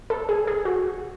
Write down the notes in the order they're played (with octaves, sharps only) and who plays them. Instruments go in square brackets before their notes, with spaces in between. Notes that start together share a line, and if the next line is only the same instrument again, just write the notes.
[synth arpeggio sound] A4
G#4
G#4
F#4